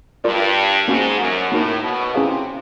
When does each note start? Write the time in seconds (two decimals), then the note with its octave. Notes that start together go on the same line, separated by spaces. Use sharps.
0.24 G2 F4 A#4 D5
0.88 G#2 A#3 C#4 F#4
1.19 F#2
1.51 A2 A#3 D#4 F#4 A#4
1.82 B2
2.14 C3 C#4 E4 G#4 C#5 F5